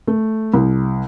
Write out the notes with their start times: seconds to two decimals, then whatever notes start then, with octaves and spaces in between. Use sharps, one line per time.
0.07 A3
0.54 C2